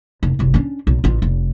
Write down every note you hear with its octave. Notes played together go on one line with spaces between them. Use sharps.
F1
F#1 C2
C#4 D4
B1
A1 F4
F1